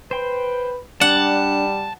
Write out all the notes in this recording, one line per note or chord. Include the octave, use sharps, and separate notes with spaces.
B4 C5 G5
G3 D4 F#5 A5